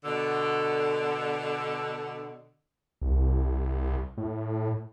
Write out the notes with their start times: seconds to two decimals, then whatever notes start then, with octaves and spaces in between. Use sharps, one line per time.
0.04 B2 D3
3.01 C2
4.18 A2